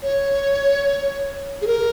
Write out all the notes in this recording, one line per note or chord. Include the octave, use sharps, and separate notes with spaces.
C#5
G#4
A#4